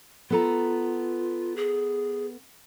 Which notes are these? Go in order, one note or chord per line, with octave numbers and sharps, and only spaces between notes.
B3 F4 A4 A#5
G#4